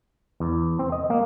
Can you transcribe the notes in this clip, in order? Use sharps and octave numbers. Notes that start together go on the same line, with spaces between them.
E2
C4
D#5
A#3